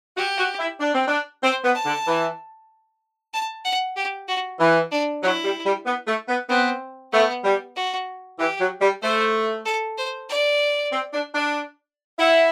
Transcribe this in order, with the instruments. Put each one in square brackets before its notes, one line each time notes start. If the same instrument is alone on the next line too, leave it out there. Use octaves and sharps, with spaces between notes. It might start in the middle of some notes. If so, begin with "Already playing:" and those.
[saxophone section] F#4 [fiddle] G4
[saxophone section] F#4
E4
D4
C4
D4
[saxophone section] C4 [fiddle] C5
[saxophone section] B3
[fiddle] A5
[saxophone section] D3
E3
[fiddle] A5
F#5
G4
F#4
[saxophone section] E3
[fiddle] D4
[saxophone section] F#3 [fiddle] E4
[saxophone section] G3
G3
B3
A3
B3
[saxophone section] B3 [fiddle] C4
[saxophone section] A3 [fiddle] B3
[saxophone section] G3
[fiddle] F#4
[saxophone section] E3 [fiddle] G4
[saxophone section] F#3
G3
[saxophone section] A3 [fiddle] C5
[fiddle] A4
C5
D5
[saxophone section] C4
D4
D4
[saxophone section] E4 [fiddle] F#5